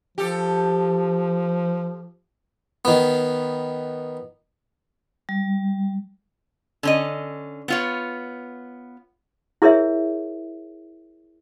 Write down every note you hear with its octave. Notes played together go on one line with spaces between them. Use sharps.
F3 G4 A4
D#3 B3
G3
D3 C#4 D#5
B3 F4 C#5
E4 G#4 A#4 C#5 E5